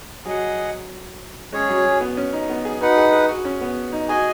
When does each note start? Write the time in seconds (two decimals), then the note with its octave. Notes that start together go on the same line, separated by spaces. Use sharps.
0.25 F#3 G#4 D#5 F#5
1.52 G#3 C#4 G#4 C#5
1.69 F#3
1.85 F#3
2.01 B3
2.17 C#4
2.33 D#4
2.49 B3
2.65 G#4
2.81 D#4 F#4 B4 F#5
2.97 G#4
3.13 G#4
3.29 F#4
3.45 C#4
3.61 B3
3.92 D#4
4.09 F#4 G#4 D#5 G#5